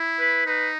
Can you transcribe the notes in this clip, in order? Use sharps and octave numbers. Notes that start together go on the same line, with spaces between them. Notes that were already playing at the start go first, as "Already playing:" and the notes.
Already playing: E4
B4
D#4 B4